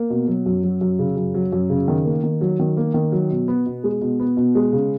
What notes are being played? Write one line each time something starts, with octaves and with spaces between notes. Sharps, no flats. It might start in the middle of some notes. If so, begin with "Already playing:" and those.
Already playing: A#3
B2
F#3
F#2
F#3
F#2
C#3
F#2
F#3
F#2
C#3
D#3
A#3
D#3
F#3
D#3
A#3
D#3
F#3
B2
B3
B2
G#3
B2
B3
B2
G#3
C#3